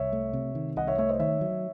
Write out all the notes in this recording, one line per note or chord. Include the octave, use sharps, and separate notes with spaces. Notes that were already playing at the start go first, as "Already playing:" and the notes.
Already playing: C2 C#5 E5
A3
C3
D#3
C2 D#5 F#5
C#5 E5
A3 C#5 E5
C5 D#5
D#3 C#5 E5
F#3